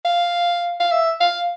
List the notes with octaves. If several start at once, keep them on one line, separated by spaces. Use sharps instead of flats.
F5
F5
E5
F5